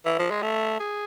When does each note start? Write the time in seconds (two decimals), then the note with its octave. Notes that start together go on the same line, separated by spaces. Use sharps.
0.06 E3
0.19 F3
0.31 G#3
0.43 A3
0.80 G#4